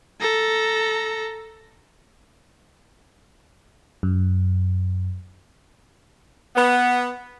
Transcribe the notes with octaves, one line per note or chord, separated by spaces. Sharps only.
A4 A#5
F#2
B3